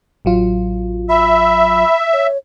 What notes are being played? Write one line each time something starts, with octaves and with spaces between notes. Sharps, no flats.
A1 F#3 F4
E5 B5
C#5